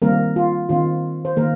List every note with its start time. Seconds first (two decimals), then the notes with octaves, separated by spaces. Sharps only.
0.02 D#3 G3 A#3 C4 A#4
0.36 F4
0.69 D#3 C4 F4
1.25 C5
1.37 D#3 A#3 A#4